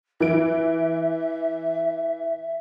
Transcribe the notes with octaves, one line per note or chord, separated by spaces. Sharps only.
E3 E5 D7